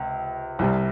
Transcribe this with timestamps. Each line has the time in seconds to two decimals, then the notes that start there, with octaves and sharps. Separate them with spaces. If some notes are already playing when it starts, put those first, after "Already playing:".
Already playing: C#2 C3
0.59 C2 C3 G3